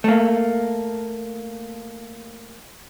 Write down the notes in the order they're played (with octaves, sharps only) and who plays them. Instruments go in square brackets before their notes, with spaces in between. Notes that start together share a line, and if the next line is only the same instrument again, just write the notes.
[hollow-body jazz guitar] A3 A#3